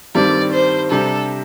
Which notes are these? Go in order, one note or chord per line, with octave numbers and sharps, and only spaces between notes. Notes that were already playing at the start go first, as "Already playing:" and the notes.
G2 D#3 G3 C4 D5
C5
C3 G3 D4 G4 A4